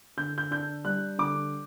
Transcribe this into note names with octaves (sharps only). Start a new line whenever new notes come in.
D3 G6
G6
D4 G6
G3 F#6
D3 D6